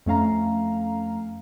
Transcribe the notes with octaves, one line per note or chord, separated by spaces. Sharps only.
F2 A3 C#4 F5 A#5